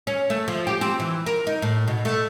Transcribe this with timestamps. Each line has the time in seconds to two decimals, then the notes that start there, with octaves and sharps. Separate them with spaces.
0.07 C#4
0.30 A3
0.48 F3
0.67 G4
0.81 C4
1.00 E3
1.26 A#4
1.47 D#4
1.62 A2
1.88 B2
2.05 A3